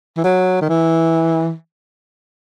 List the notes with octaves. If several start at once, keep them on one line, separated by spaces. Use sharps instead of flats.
E3
F#3
D#3
E3